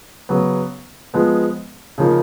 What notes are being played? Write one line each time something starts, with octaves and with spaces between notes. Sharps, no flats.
C#3 F#3 B3
F3 G#3 B3
C#3 F3 A#3 D#4